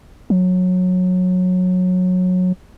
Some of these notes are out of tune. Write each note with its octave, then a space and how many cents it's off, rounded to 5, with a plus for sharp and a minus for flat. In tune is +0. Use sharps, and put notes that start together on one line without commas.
F#3 -20